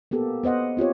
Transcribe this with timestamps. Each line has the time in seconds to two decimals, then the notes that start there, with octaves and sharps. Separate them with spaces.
0.11 A#3 B3 G4 A4
0.43 B3 C5 D#5 F#5
0.77 C4 F4 G4 C#5